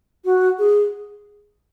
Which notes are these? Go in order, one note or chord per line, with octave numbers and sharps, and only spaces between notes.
F#4
G#4